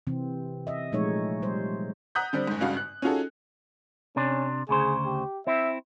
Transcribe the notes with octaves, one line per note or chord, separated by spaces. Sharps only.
C3 E3 C4
D#5 E5
A#2 F3 G#3 A3 D#4 C#5
G3 C5
F#5 A#5 D#6 F#6 G6 B6
D3 G3 C4
F#1 G#2
G#1 G2 C#3 F#4 F5
F#6
C#4 D#4 F4 F#4 G#4 A4
C3 C#4 D4
D2 C#3 G#4 C5
G4
C4 E4 E5